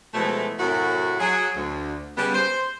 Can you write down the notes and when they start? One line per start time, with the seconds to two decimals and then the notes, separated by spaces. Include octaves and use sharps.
0.14 B2 E3 F3 G#3 A3
0.59 F#2 A2 C3 F#3 E4 F#4
1.20 F#3 G#4
1.56 D2
2.17 C#3 G3 B3
2.34 C5